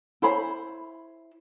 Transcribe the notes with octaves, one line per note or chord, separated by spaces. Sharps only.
E4 C5 C#5 B5